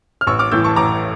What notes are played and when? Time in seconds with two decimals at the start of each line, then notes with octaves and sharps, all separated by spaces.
0.21 F6
0.27 A1 C#6 E6
0.39 D6 F6
0.51 A2 E3 E6 G6
0.64 A5 C#6
0.76 A1 A#5 D6